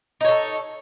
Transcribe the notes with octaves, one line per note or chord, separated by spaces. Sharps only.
D#4 A4 C#5